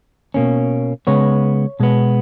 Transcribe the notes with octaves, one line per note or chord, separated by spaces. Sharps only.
B2 A#3 C#4
C#3 G#3 B3 C#5
B2 G#3 B3